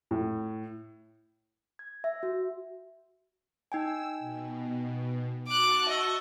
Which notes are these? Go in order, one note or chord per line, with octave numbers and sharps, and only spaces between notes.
A2
G#6
E5
F#4
D#4 G5 G#5 E6
B2
F#4 A5 C#6 D6 F#6
D#5 E5 E6